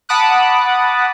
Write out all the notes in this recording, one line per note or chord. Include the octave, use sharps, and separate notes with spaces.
F#5 A5 B5 D6 D#6 F#6